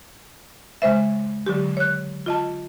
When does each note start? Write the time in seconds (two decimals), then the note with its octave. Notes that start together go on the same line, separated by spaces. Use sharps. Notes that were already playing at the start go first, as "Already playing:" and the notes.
0.82 C#3 G#3 C5 E5
1.46 D3 F#3 G4
1.77 C#5 F#6
2.26 F4 D#5 A5